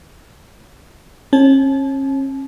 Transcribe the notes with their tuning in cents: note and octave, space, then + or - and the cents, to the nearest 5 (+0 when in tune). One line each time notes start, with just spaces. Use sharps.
C#4 -35 A5 -35